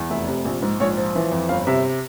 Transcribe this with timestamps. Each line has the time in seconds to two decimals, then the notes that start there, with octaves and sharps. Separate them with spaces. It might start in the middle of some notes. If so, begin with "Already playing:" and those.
Already playing: E2
0.10 F1 E5
0.27 C3
0.45 A#1
0.62 G#2
0.80 A#1 C#5
0.97 F3
1.15 E3
1.32 F2
1.49 G1 F5
1.67 C3 E5